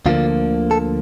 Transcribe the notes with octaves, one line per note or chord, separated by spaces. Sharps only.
D2 D3 F3 A#3 F4
A4